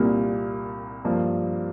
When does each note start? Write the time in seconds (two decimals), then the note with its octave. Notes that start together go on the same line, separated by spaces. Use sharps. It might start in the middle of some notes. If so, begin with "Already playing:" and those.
Already playing: C2 A#2 G3 A#3
1.05 G2 F3 A#3